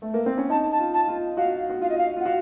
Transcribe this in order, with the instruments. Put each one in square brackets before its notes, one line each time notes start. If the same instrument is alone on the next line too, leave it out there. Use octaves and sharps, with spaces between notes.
[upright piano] A3
A#3
C4
C#4
[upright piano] D#4 [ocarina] A5
[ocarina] A5
[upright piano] F4
[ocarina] A5
[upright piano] F4
[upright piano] F#4 [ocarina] F5
[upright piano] F#4
[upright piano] F4 [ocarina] F5
[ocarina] D#5
F5
[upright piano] F4
[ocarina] F#5
[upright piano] F#4 [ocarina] F5